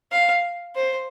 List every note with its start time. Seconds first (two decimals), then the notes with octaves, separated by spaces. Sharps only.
0.12 F5
0.76 C5